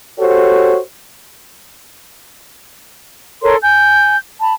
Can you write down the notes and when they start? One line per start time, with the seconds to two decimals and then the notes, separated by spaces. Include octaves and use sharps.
0.19 F#4 G4 A4 C5 C#5
3.43 A4 A#4 C#5 C6
3.62 G#5 G6
4.40 A5 B5